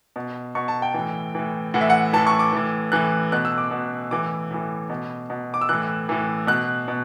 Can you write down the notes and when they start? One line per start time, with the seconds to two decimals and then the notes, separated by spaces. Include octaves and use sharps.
0.16 B2
0.55 B2 C#6
0.68 A5
0.82 G5
0.94 A2 E3
1.35 A2 E3
1.74 A2 E3 F#5
1.81 E5
1.90 F#5
2.13 A2 E3 A5
2.27 C#6
2.39 D6
2.52 A2 E3
2.92 A2 E3 F#6
3.32 B2 F#6
3.45 E6
3.58 D6
3.71 B2
4.11 A2 E3 D6
4.51 A2 E3
4.90 B2
5.30 B2
5.54 D6
5.61 E6
5.69 A2 E3 F#6
6.09 A2 E3
6.47 B2 F#6
6.88 B2